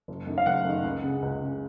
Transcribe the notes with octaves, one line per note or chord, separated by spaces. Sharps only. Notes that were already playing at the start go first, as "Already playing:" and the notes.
F#1
F#2 D#3
F5
F#1 F#5
F#2 D#3
C#2
C#3
C#2
C#3